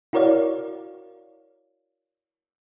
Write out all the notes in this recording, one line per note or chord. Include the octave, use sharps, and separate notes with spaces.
E4 F#4 A#4 C#5 D5 F5